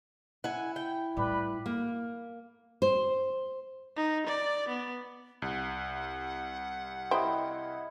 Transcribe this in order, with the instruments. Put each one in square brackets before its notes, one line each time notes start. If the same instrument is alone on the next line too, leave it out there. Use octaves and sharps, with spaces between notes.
[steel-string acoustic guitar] E4 [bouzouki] F#5 G#5
[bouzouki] G5
[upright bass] A2 G3 [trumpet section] B4 D5 B5
[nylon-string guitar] A#3
C5
[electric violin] D#4
D5
B3
[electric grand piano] C2 [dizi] F#5
[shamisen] G3 C5 G5 [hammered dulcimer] E4 D#5